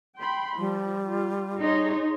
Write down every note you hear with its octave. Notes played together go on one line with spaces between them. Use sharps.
G5 B5 C6
F3 G3
F4
D#4 G#4 C#5 C6